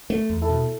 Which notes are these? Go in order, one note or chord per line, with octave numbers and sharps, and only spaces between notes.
A3
E2
E4 A4
B2